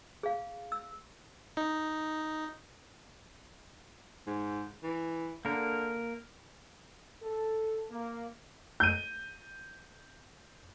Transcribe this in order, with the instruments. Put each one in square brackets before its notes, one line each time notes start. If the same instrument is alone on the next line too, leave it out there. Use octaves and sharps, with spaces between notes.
[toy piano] G#4 F5
E6
[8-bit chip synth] D#4
[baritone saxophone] G#2
E3
[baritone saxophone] D3 [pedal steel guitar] A#3 A#4
[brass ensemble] A4
A#3
[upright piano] G6 D#7